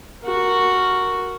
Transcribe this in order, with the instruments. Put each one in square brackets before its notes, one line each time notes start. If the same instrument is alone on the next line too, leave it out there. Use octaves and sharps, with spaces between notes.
[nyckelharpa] F#4 A#4